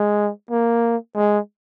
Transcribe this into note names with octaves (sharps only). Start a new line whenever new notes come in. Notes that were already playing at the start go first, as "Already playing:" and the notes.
Already playing: G#3
A#3
G#3